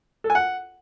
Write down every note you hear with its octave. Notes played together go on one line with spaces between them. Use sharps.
A4
G#5
F#5